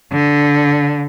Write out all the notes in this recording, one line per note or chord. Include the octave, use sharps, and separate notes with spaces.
D3